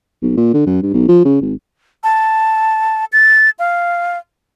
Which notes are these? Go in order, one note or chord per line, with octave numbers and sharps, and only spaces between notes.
B1
A#2
D3
F#2
G2
B1
F3
C#3
G#1
A5
A6
F5